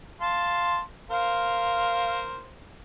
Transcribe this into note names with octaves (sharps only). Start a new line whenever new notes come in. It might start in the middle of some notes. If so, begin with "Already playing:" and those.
F5 A5 C6
A#4 C5 F5